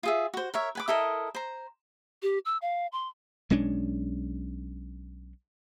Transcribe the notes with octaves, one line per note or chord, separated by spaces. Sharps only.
F4 G#4 E5
F#4 C5
A#4 C#5 E5
B4 G#5 D6
E4 A4 A#4 D#5
C5 A#5
G4
E6
F5
C6
B1 G#3 C#4 D4